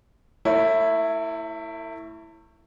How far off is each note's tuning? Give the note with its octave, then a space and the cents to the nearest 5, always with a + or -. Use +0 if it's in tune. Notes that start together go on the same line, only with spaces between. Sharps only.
A3 +45 E4 +0 C#5 -10